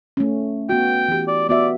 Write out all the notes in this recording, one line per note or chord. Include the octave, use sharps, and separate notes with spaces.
A3 C#4
B3 F#4 G5
E3 G4
D5
B3 F#4 D5 E5